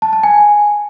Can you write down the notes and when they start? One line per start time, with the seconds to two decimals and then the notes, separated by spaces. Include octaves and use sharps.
0.02 A5
0.13 A5
0.23 G#5